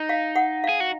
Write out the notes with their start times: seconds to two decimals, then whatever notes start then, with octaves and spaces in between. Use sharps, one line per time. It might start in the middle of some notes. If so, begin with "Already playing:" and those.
Already playing: D#4
0.09 F5
0.36 F#5
0.64 F5
0.69 G#4
0.80 F#4